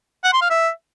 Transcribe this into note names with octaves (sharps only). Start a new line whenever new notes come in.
F#5
C6
F5
E5